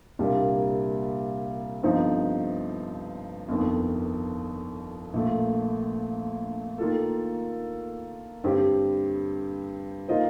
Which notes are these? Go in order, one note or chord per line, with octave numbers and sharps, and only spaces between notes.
C2 A#2 G3 A#3 D4
G1 G2 F3 C4 D#4
G1 F2 D#3
A#1 A#2 A3
D#3 A#3 F4 A4
G2 D3 G3 C4 G4
D#3 A#3 F4 C5 D#5